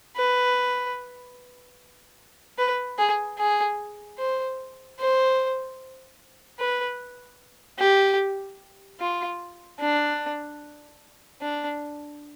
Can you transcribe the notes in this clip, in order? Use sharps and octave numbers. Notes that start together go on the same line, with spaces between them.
B4
B4
G#4
G#4
C5
C5
B4
G4
F4
D4
D4